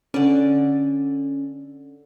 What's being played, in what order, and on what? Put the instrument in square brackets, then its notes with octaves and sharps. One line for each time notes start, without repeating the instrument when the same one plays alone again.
[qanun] D3 D5 [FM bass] C#4